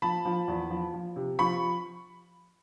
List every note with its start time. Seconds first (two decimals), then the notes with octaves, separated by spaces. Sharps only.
0.02 F3 A5 B5
0.25 F3
0.48 E2
0.70 F3
0.94 F3
1.16 C3
1.39 F3 B5 C#6